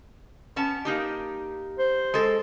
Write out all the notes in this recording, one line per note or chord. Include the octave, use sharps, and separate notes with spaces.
B3 C#4 A5
A#3 D#4 G4
C5
G#3 A4